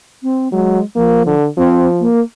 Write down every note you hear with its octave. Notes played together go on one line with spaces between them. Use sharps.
C4
F#3 G#3
F3 A#3
D3
F3 C4
A#3